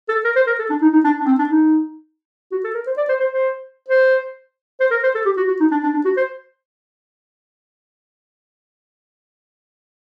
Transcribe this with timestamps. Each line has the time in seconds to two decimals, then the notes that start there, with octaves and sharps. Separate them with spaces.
0.09 A4
0.25 A#4
0.36 C5
0.47 A#4
0.59 A4
0.70 D4
0.82 D#4
0.93 D#4
1.04 D4
1.20 D4
1.26 C4
1.39 D4
1.49 D#4
2.52 F#4
2.64 A4
2.74 A#4
2.87 C5
2.97 D5
3.09 C5
3.20 C5
3.32 C5
3.89 C5
4.80 C5
4.91 A#4
5.03 C5
5.15 A4
5.25 G4
5.37 F#4
5.48 F#4
5.60 D#4
5.71 D4
5.83 D4
5.94 D4
6.05 F#4
6.17 C5